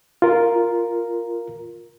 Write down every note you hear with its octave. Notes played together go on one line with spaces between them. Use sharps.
F4 A#4